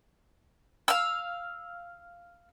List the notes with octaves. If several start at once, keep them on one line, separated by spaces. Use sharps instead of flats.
F5 E6